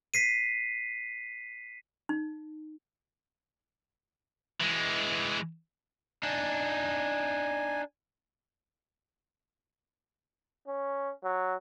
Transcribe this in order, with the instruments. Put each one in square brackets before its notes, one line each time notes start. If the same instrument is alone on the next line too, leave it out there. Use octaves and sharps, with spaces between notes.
[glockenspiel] B6 C7 D#7
[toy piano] D#4
[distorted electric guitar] E3 G#3
[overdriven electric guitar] D4 D#4 [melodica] G#5
[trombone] C#4
F#3